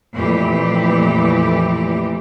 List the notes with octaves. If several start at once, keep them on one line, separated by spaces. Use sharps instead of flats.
F2 A#2 E3 A3 G4